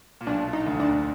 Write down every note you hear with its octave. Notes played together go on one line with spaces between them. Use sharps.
A#2
B1 B2 D4
D#4
D2 D3
D4